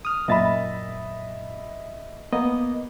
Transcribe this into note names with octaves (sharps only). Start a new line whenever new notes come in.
D#6 F6
F#2 A#2 D#5 E5 B5 A6
A#3 B3 D#5